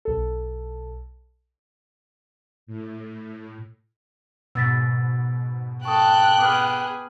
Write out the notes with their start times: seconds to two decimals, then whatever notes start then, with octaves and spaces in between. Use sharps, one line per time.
0.05 B1 A4
2.67 A2
4.55 G#2 B2 E6 A6 B6
5.85 A4 G5 C#6 D#6 F#6
6.39 B3 G#4 D6 D#6 F6